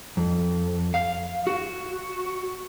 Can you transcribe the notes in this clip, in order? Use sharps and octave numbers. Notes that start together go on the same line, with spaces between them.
F2
F5
F#4